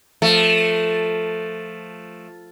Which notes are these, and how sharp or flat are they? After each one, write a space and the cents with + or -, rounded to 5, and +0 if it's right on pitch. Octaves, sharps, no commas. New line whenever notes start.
F3 +0 A3 +0